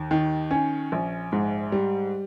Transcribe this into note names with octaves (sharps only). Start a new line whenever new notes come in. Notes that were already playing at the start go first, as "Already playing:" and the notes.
Already playing: D#2
D#3
C#4
A#1
G#2
G3